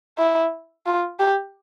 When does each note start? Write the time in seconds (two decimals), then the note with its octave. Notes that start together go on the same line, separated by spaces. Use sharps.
0.18 E4
0.86 F4
1.20 G4